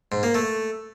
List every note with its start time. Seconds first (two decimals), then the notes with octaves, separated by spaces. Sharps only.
0.12 G#2
0.23 A#3
0.35 A3